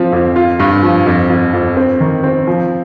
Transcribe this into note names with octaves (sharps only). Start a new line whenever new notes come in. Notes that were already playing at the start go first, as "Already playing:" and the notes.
Already playing: F3 C4
F2
F4
G2
F3
F2
F2
F2
C4
D#3
C4
F3